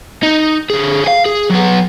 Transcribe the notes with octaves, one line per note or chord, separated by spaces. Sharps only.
D#4
D3 G#4
F5 G#5
G#4
F#3 B3